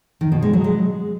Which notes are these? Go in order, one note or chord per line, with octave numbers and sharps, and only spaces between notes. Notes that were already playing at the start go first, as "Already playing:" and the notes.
D#3
B2
G#3
F#3
G#3